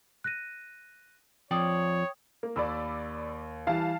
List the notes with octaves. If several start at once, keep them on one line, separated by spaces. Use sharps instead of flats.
F#6 A#6 D#7
F2 F3 C#5 D5 G5 D#6
A#3
D#2 D5 B5 E6
E3 G3 F5 A5